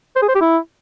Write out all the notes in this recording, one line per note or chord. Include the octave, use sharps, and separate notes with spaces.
C5
G#4
C5
G4
E4